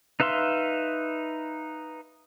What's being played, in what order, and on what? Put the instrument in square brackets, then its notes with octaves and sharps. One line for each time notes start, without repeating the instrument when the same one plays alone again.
[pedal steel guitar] D#4 B4 E5 F5 C6